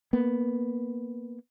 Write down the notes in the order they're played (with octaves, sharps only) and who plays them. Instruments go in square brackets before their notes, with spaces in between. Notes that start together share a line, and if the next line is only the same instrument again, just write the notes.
[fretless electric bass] A#3 B3